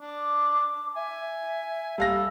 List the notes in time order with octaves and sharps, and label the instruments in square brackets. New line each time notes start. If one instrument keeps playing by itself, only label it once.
[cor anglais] D4 [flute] D6
[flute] E5 [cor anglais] G#5
[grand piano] G3 F5 A#6 [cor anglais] A4